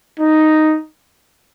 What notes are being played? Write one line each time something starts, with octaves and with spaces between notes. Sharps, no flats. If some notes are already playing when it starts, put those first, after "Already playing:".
D#4